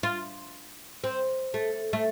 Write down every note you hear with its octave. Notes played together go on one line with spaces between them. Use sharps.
F4
C4
A3
A3